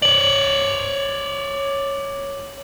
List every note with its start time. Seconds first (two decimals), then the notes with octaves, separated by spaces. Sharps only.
0.02 C#5 D5 F#7